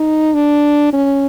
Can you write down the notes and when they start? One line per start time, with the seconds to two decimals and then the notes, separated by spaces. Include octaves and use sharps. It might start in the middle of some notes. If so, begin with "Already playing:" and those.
Already playing: D#4
0.34 D4
0.93 C#4